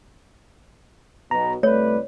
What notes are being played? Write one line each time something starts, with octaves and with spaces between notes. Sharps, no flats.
B1 B2 A#5
C2 A3 B4 C#5 D5